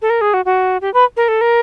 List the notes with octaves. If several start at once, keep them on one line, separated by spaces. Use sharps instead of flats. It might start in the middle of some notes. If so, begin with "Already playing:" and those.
A4
A#4
G#4
F#4
F#4
G4
B4
A#4
A4
A#4